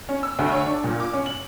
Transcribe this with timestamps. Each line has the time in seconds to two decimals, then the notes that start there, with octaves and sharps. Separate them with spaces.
0.09 C#4
0.23 E6
0.39 D2
0.52 C#5
0.66 D4
0.84 A#2
1.00 D6
1.13 C#4
1.26 F#7